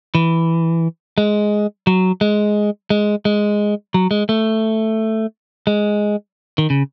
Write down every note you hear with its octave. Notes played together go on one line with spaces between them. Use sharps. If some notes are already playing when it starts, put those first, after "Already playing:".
E3
G#3
F#3
G#3
G#3
G#3
F#3
G#3
A3
G#3
D#3
C#3